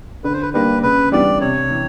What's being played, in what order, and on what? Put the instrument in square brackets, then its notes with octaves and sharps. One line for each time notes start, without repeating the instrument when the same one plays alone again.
[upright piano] D3 [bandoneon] B4
[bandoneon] C5
B4
[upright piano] G3 A#3 D4 [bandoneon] B4
[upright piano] C#3 [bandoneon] B4
[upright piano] E3 G3 B3 D4 [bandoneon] D5
[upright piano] C3 [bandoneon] C#5
[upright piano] E3